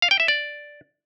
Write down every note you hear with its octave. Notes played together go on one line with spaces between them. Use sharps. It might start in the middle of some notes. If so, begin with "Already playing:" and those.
F5
G5
E5
D5